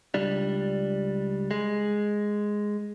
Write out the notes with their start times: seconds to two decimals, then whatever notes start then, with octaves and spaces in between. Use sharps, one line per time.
0.14 C#2 G3 D4
1.51 G#3